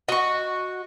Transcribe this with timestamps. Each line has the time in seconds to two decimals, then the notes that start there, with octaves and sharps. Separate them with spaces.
0.08 F#4 D#5 C#6